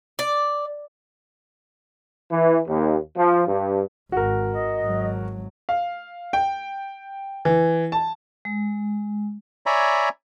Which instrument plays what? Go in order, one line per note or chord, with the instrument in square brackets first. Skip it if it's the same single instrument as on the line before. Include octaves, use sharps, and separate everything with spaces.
[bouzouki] D5
[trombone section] E3
D#2
F3
G2
[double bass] G#1 [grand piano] F#4 A#4
[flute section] D#5
[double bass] G#1 F#3
[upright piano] F5
G5
E3
A5
[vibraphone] G#3
[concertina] C#5 D5 E5 G#5 A#5 B5